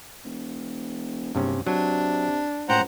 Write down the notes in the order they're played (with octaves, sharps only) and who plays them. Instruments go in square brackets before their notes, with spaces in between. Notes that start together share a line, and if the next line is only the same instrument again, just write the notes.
[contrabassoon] E1
[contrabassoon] F#1 [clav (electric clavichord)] G2 C3 C#4
[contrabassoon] C3 [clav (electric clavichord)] F#3 [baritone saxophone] D4
[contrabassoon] C#2 [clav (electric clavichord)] A2 G5 [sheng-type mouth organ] C5 F#5 A#5